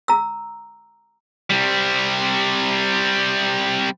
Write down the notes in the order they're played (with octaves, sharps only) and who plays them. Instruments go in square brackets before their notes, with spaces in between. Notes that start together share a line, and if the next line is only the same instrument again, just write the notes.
[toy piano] A#5 E6
[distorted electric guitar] C3 G3